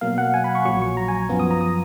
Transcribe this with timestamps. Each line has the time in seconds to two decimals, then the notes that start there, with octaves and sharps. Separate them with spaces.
0.01 B2 F#3 A#3 F5
0.18 F#5
0.34 G#5
0.44 B5
0.55 C#6
0.65 A#1 A#2 F#3 C#6
0.82 C#6
0.97 A#5
1.08 G#5
1.29 F#2 F3 B3 F4
1.40 D#6
1.51 A#5
1.61 D#6